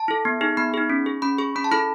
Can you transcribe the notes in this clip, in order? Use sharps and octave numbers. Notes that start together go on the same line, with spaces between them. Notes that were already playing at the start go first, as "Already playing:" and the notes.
Already playing: A5
E4 A4
B3
D#4 G#4
B3 B5
D#4 G#4
C#4
G#4
C#4 B5
G#4 C#6
C#4 B5
A5
E4 A4 B5